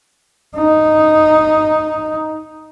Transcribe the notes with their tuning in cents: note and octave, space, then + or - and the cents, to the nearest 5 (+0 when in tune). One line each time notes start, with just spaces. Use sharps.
D#4 -5